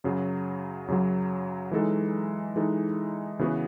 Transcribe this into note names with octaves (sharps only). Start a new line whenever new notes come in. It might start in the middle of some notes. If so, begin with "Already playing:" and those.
F#2 C#3 F#3
F#2 C#3 F#3
E3 G#3 D#4 A4
E3 G#3 D#4 A4
C#3 E3 B3 F#4 B4